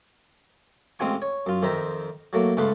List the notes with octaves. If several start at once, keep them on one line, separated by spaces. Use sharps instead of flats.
A1 G#3 C4 F4 G#5 C#6
C#5
F#2 F4
F2 D#3 C5 E5 A#5
F#3 A3 A#3
C#2 G#2 A3 B4 F5 C6